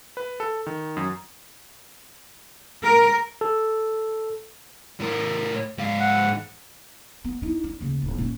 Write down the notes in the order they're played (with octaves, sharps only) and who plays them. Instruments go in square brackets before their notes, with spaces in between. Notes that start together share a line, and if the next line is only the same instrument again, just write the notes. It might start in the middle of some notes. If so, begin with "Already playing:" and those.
[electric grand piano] B4
A4
D#3
F#2
[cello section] A#4
[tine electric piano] A4
[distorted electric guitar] A2 A#4
G#2 F5
[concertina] F#5
[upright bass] B3
D#4 E4
D4
D#2 C#3
D1
A#2 C#4